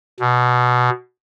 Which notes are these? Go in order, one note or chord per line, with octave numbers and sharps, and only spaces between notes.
B2